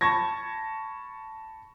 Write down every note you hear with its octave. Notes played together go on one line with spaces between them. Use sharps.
A5 B5 C#6 G#6 A#6